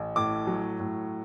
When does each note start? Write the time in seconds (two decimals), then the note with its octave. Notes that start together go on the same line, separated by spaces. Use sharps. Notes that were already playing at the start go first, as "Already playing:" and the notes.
Already playing: A1
0.16 A2 D6
0.47 F#3
0.80 A2